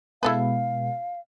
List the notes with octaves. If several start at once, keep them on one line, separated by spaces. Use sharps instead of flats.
B2 G#3 B3 E4 A4 B4 F5